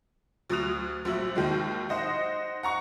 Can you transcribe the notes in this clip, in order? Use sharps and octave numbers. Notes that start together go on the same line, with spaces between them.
D2 F#3 D#6 F#6 F7
A#1 F#3 E5 F#7
D#2 D#3 F#3 G#3
D#4 C5 D#5 F#5
F#5 A#5 C#6